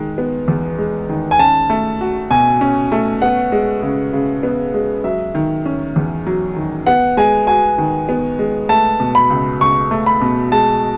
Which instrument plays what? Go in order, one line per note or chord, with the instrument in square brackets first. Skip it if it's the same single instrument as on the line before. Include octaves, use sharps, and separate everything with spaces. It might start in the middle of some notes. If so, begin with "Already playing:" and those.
Already playing: [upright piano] D#3 G#3
B3
E2
G#3
D#3
[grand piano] G#5
[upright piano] C#4 [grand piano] A5
[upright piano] A3
F#4
[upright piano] B2 [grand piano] G#5
[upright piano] C#4
A3
[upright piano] B3 [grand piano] F#5
[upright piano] G#3
C#3
C#3
B3
G#3
[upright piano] F#3 [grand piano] E5
[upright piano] D#3
C#4
E2
F#3
D#3
[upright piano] B3 [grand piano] F#5
[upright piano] G#3 [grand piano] G#5
[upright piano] F#4 [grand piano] G#5
[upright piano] D#3
B3
G#3
[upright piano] A3 [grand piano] A5
[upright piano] B2
[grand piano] B5
[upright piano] C#2
[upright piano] C#2 [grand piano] C#6
[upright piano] A3
[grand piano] B5
[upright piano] B2
[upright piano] G#3 [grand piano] A5